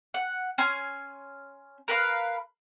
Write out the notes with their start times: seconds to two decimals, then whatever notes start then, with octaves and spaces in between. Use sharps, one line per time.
0.14 F#5
0.58 C#4 G#5 C6
1.88 A#4 B4 F5